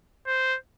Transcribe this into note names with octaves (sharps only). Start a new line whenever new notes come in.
C5